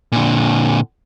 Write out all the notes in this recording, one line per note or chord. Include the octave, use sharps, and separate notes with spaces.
A#2 D3